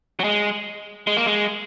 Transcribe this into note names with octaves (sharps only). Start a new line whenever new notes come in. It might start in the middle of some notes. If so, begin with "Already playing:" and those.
F#3
G#3
G#3
A#3
G#3